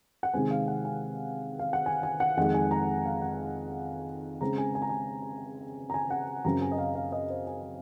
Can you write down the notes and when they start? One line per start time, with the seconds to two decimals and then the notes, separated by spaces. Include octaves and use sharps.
0.23 F#5
0.34 C3 D#3 G#3 C4 G#5
0.51 F5
0.68 F#5
0.85 G#5
1.59 F5
1.73 F#5
1.86 G#5
2.03 G#5
2.20 F#5
2.37 F2 D#3 G#3 F#5
2.54 G#5
2.71 A#5
3.05 F5
3.22 F#5
4.41 C#3 G#3 C4 A#5
4.58 G#5
4.75 G#5
4.82 A#5
4.89 G#5
5.90 A#5
5.94 G#5
6.11 F#5
6.45 F#2 C#3 F#3 C4 A#5
6.62 G#5
6.72 D#5
6.78 F5
6.95 F5
7.12 D#5
7.30 C5
7.47 G#5